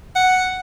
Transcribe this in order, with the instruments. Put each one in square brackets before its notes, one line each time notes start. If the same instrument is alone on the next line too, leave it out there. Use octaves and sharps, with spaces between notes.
[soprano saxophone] F#5